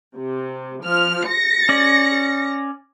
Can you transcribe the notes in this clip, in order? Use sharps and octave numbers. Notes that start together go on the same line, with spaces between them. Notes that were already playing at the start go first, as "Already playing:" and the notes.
C3
F3 F6
A#6 C#7
C#4 D5